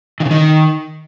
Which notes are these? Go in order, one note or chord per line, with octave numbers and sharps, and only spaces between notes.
D#3
C#3
D#3